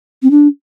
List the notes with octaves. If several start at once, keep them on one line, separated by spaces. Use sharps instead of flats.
C4
D4